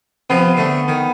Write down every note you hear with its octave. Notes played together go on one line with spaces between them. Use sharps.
C3 F3 B3
D3 A3
D#3